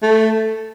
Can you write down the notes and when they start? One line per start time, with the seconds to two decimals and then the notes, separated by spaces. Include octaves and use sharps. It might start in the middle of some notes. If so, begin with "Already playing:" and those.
0.03 A3